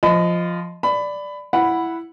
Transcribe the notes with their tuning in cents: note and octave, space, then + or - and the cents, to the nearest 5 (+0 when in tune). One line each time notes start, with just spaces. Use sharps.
F3 +0 D#5 +0 B5 +40
D5 +0 B5 +20
E4 +10 F#5 +0 B5 +0